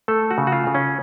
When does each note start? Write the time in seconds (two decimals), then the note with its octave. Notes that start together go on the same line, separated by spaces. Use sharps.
0.08 A3 A4
0.31 F#4
0.38 C#3
0.47 F#4
0.52 F4
0.67 C#3
0.75 C#4